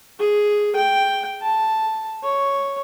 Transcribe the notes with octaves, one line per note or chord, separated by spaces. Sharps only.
G#4
G5
A5
C#5